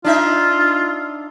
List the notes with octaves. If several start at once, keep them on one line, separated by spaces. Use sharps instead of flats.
D4 D#4 F4 E5